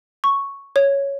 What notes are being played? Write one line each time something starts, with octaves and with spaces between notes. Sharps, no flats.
C#6
C#5